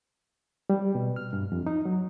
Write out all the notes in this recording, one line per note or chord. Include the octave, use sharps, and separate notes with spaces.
G3
B2
F6
G2
F2
D#4
F#3